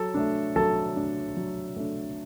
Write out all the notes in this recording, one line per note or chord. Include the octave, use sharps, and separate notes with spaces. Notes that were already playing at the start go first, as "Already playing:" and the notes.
Already playing: F#3 A4 A5
A3 D4
F#3 A4 A5
A3 D4
F#3
A3 D4